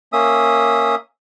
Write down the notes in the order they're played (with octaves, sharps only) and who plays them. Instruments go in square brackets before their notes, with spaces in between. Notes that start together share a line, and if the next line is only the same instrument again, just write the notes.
[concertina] A#3 C#4 E5 D#6